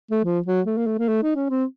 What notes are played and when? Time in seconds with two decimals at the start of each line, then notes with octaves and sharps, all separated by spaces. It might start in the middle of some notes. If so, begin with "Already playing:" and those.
0.11 A3
0.24 F3
0.46 F#3
0.66 A3
0.77 A#3
0.87 A3
0.98 A#3
1.08 A3
1.22 D#4
1.35 C#4
1.50 C4